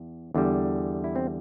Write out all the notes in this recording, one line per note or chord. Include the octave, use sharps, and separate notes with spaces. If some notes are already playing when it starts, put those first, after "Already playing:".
Already playing: E2
E2 D3 G3
E4
C4